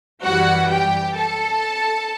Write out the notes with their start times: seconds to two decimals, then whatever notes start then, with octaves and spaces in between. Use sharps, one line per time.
0.24 F#2 E3 G3 F#4 F#5
0.70 G4 G5
1.16 A4 A5